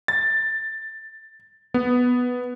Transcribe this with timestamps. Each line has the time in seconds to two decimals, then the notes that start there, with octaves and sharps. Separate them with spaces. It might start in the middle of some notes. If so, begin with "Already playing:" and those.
0.08 A6
1.74 B3